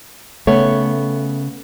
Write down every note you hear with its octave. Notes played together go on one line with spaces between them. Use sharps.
C#3 A3 B3 C#5